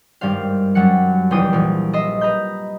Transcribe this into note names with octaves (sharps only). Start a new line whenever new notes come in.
G#1 G2 G3 C5 F5
F#2 F#3 G3 F#5 C#7
F1 E2 C5 G5 D#6 D#7
A#1 E3
D#5 E5 C6 D#6
B4 D#5 A#5 B5 G6